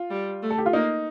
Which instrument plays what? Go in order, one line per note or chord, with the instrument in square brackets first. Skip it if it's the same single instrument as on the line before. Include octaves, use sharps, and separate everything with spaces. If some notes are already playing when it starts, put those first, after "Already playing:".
Already playing: [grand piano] F4
[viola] G3
A3
[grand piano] A4
G4
F4
[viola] A#3 [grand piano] D#4